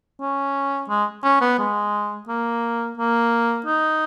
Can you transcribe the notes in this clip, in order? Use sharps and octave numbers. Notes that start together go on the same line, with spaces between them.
C#4
G#3
C#4
B3
G#3
A#3
A#3
D#4